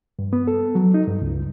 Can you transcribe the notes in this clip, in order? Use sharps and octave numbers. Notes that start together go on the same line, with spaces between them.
G2
B3
A4
F#3
D#4
G2
C#2